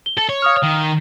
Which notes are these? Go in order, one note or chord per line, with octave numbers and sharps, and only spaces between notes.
G7
A4
C#5
F5 D#6 F6
D#3